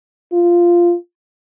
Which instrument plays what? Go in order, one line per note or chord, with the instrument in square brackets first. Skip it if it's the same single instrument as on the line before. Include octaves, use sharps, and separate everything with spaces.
[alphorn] F4